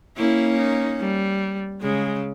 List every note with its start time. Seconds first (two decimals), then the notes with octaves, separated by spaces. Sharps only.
0.17 A#3 C#4 E4
0.58 D#4
1.00 G3
1.81 C#3 G#3